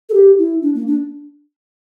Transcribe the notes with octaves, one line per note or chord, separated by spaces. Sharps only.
A4
G4
E4
D4
A#3
D4